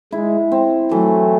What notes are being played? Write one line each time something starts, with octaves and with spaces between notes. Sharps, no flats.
G#3 E4
C4
E3 F#3 A3